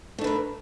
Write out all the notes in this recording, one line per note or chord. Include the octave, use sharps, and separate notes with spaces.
A3 D4 A#4 B4